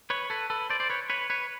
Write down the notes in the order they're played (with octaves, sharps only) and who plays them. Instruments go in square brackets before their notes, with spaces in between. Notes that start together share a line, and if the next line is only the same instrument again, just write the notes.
[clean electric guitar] B4 C#5
A4 B4
A4 B4
C5 D5
C5 D5
B4 C#5
B4 C#5
B4 C#5